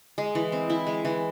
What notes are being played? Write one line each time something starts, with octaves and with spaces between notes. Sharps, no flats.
G#3
E3
C4
E4
G#3
E3